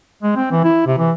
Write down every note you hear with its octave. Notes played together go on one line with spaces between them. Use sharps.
G#3
C4
E3
E4
C3
E3